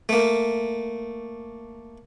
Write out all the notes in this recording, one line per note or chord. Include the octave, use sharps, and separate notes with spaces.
A3 A#3